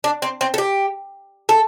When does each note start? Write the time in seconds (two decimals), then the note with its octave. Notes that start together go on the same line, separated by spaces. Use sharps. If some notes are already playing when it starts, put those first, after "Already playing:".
0.04 D4
0.22 C4
0.41 C4
0.54 A4
0.58 G4
1.49 A4